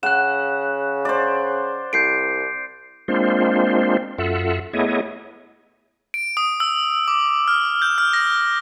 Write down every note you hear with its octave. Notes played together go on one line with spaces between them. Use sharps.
C#3 F#5 F#6 E7
C5 D5
C2 G6 C7 D7
G#3 A#3 C4 D4 F4 C5
F#2 F4 A4 E5 F#5
A3 B3 E4 G#4 C#5 D#5
D7
D#6
E6
D6
F6
G6
F6
A#6